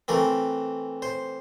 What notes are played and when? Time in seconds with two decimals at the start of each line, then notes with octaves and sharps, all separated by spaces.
0.08 E3 A3 C4 A#4
1.02 C5